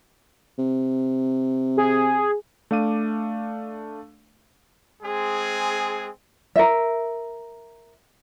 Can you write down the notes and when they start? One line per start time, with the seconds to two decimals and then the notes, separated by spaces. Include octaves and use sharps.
0.58 C3
1.77 G#4
2.71 A3 D4 F5 D6 D#7
5.03 G#3 C4 G#4
6.56 A#4 E5